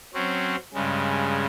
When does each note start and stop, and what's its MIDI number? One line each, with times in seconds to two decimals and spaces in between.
0.14 0.56 54
0.14 0.56 60
0.14 0.56 61
0.74 1.46 43
0.74 1.46 49
0.74 1.46 56